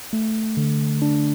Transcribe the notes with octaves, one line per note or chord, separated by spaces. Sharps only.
A3
D3
D4